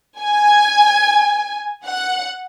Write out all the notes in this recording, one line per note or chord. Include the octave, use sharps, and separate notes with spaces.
G#5
F#5